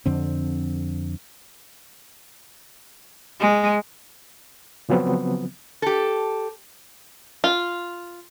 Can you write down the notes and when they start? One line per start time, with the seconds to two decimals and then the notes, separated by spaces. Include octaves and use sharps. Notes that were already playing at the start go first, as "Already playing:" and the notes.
0.06 F2 D3 C4
3.40 G#3
4.89 C#3 F3 F#3 B3 C4
5.82 G4 A4
7.44 F4